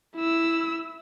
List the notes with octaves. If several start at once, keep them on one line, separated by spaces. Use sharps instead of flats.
E4 E6